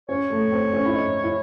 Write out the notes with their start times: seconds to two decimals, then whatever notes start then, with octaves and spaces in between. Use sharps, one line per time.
0.09 C#4 C#5
0.30 A3
0.52 C4
0.73 C#4
0.86 E4
0.95 D#4
1.24 E4